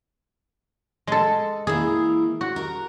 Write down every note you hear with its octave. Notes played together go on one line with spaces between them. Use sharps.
G#3 A4
E3 A#3 G#4
F#4
A#4 A#5